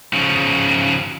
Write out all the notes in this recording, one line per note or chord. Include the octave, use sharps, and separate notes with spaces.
C#3 F3